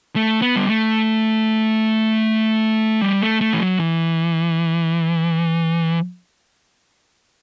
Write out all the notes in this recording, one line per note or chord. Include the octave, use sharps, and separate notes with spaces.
A3
B3
G3
A3
G3
A3
A3
E3
F#3
E3